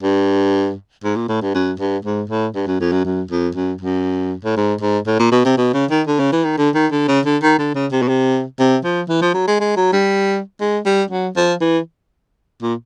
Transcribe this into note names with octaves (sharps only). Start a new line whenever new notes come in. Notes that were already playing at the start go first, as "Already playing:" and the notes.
G2
G#2
A#2
A2
G2
F#2
G2
G#2
A2
G2
F#2
F2
F#2
F#2
F2
F#2
F#2
A2
G#2
G#2
A2
A#2
B2
C3
B2
C#3
D#3
D3
C#3
E3
D#3
D3
D#3
D3
C#3
D3
D#3
D3
C#3
C3
B2
C3
C3
F3
E3
F3
F#3
G#3
G#3
F#3
G3
G#3
G3
F#3
F3
E3
A#2